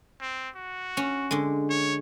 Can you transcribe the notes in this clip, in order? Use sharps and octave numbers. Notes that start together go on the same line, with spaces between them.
C4
F#4
C#4
D3 G#3
C#5